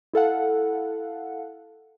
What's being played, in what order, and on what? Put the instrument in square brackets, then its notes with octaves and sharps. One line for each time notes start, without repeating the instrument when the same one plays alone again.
[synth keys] E4 A4 F5 F#5